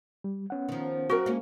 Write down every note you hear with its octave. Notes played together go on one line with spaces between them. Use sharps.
G3
B3 C#4 F#5
D#3 F3
F#3 C4 F#4 A#4
G#3 A#3 C#4